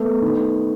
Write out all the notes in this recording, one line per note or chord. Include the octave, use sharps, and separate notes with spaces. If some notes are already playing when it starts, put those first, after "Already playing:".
Already playing: A3 B3
D#3